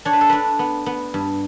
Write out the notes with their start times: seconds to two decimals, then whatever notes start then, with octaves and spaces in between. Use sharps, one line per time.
0.05 D4 C#5
0.13 B4
0.21 A4
0.29 D4 B4
0.59 B3
0.86 B3
1.14 G2